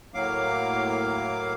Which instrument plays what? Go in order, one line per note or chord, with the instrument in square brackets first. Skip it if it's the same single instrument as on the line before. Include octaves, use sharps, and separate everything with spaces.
[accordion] A2 F#3 A#3 F5 D6